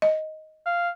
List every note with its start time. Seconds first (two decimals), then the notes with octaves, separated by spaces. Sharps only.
0.02 D#5
0.66 F5